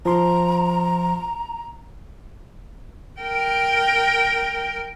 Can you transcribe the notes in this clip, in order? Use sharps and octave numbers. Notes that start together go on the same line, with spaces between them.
F3 F4 A#5 C6
A#4 G5